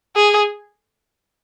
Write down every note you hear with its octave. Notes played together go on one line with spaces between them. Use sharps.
G#4